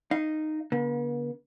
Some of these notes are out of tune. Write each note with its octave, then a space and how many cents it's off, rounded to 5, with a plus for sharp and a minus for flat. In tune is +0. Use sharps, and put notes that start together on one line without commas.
D#4 -10 F5 -10
D3 -45 B3 -45